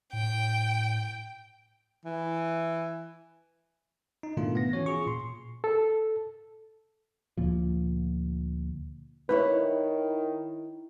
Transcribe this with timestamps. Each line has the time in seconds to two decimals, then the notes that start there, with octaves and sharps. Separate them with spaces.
0.13 A2 G5
2.05 E3
4.23 D#4
4.37 G#2 B2 D#3 A3 D4 F4
4.55 B3 A#6
4.73 E3 C#4 F#4 C#5
4.86 F4 G#4 C#6
5.07 A#2 C6
5.64 A4
7.37 D2 A#2 F3
9.29 D#3 D#4 E4 B4 C#5